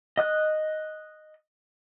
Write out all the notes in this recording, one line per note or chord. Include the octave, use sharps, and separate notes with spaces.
D#5 D#6 F#6